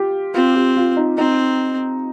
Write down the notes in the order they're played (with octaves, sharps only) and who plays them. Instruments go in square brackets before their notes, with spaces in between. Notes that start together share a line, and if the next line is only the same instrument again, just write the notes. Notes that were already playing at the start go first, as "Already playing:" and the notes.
Already playing: [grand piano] F4 G4
[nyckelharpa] C4 [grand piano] F4
[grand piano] G4
F4
D#4
[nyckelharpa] C4 [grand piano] D#4